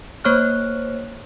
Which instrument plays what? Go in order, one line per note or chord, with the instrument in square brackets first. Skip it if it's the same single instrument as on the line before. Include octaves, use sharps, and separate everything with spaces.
[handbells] A#3 C5 C#5 C#6 F6 F#6